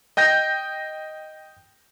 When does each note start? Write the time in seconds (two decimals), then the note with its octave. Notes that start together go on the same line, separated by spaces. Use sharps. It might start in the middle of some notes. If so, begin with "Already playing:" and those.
0.17 D#5 G5 G6 A#6